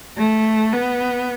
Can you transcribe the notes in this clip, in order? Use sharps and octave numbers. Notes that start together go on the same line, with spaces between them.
A3
B3